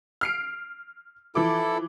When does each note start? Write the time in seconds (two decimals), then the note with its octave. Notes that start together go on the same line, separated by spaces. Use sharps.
0.21 F6 C7 D7
1.35 E3 F3 E4 A4 D6